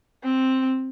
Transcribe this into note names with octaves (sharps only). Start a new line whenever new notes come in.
C4